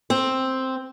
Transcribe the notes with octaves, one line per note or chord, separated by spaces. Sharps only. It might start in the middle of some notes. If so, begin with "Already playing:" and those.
C4